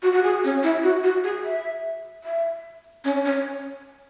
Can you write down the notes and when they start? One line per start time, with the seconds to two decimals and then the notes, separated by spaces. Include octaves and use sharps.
0.02 F#4
0.13 F#4
0.23 G#4
0.43 C#4
0.63 E4
0.83 F#4
1.03 F#4
1.23 G#4
1.44 E5
2.24 E5
3.04 C#4
3.25 C#4